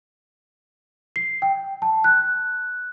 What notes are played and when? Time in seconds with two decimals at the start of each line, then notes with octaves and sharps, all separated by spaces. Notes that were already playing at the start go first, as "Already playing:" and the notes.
1.16 C7
1.42 G5
1.82 A5
2.04 F#6